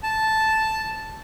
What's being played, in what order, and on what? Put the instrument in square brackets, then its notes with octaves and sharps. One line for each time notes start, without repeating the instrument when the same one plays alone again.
[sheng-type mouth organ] A5